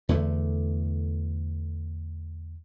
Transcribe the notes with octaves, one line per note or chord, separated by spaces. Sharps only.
E2 D3 A3